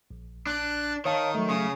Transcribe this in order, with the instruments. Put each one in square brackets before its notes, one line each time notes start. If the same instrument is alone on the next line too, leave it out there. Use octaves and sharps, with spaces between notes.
[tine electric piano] A#1
[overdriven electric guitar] D4 [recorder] F#6
[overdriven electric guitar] D#3 [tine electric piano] C#5 F5 A5 [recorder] D#6
[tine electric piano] F#3 A3
[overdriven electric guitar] C#3 [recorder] D#6